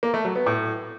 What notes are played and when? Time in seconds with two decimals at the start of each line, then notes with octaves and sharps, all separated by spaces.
0.03 A#3
0.14 A3
0.25 F#3
0.36 B3
0.46 A2